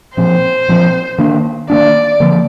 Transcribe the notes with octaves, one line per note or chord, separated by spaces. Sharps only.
A#2 F3 C4 C5
A#2 F3 C4
D#3 A#3 D4
D#3 A#3 D4 D5
D3 F3 A#3